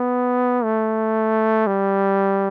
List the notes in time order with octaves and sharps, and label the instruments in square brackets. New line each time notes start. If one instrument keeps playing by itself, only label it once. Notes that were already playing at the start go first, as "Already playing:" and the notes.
Already playing: [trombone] B3
A3
G3